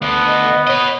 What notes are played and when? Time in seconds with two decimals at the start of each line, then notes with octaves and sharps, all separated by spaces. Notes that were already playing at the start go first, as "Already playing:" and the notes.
0.02 D2 B3
0.27 D#5
0.67 B4 C#5 D#5